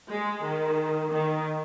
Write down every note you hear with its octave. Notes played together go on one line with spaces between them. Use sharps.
G#3
D#3
D#3